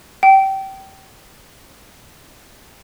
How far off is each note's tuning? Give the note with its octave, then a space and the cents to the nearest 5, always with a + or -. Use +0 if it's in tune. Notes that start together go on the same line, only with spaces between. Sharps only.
G5 -25